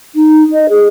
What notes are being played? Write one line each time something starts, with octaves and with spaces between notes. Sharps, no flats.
D#4
D#5
G#4